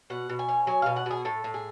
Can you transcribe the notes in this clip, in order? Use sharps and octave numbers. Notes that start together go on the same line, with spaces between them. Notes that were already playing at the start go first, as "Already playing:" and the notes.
B2 F#5
B2
G#5
C#4
F#3 G#5
B2 F5
F#5
B2 G#4
A2 A4
A2
G#4